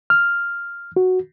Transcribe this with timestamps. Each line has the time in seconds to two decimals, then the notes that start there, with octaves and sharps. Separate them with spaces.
0.10 F6
0.96 F#4